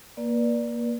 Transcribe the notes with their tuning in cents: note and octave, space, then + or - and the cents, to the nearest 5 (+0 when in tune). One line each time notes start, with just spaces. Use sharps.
A#3 +15 B4 -35 D5 +0